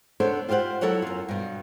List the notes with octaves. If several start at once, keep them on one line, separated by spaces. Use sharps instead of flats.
B3 D4 A4 C5 C#5
F4 G4 C5 F5 F#5
F#3 E4 A4 C#5 F#5
F#2 F4
G2 B2